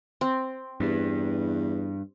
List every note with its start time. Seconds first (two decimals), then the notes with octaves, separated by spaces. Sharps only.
0.21 C4
0.80 E2 G2